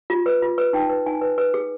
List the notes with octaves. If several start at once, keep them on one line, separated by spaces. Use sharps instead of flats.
F4
B4
F4
B4
D#4 G5
B4
D#4 G#5
B4
B4
G#4